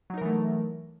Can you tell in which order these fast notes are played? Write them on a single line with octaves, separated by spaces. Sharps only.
F#3 D#4 A#4 E3 A3